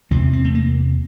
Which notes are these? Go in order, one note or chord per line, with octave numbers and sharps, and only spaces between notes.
E2 C3 C4
C4
A3
A#3